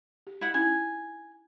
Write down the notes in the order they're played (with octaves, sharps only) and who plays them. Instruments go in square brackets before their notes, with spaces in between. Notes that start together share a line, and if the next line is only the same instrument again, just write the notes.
[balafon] G4
[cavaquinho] E4 F#5
[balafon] C#4 D#4 E4 [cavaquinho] G#5